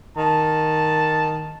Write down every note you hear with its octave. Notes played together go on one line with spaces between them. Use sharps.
D#3 A5